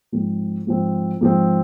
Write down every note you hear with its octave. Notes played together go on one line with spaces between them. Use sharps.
G#2 F3 C4
G#2 F3 C4
G#2 F3 C4